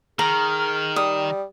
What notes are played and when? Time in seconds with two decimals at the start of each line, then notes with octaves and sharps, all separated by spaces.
0.19 D#3 G#4 A#5 F6
0.96 G3 D#6